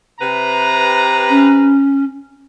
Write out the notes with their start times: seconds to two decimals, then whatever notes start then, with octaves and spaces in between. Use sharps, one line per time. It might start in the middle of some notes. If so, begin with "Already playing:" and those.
0.21 C3 B4 A#5
1.30 C#4